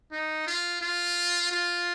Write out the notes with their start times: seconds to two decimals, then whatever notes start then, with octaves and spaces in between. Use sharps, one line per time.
0.12 D#4
0.47 F4
0.81 F4
1.51 F4